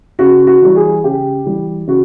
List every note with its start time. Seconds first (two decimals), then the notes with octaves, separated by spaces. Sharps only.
0.19 C#3 F#4
0.47 F#4
0.61 E3 G3
0.76 G#4
1.04 C#3 G4
1.45 E3 G3
1.87 C#3 F#4